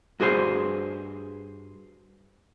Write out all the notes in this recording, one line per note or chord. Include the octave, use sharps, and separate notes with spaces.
G2 F#4 G#4 C5 C6